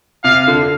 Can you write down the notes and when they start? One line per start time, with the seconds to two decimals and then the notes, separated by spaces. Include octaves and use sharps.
0.24 C3 F5
0.48 D3
0.62 D3